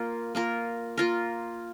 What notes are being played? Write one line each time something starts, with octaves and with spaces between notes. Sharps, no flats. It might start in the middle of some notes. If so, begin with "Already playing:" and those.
Already playing: A#3 F4 A#4
A#3 F4 A#4
A#3 F4 A#4